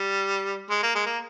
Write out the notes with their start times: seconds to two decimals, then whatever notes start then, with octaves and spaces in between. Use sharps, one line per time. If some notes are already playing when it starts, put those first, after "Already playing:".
Already playing: G3
0.70 G#3
0.83 A#3
0.95 G#3
1.06 A#3